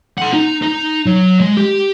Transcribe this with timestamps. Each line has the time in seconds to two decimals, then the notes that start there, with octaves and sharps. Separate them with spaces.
0.18 F#5 C6
0.33 D#4
0.62 D#4
1.06 F#3
1.41 G#3
1.57 G4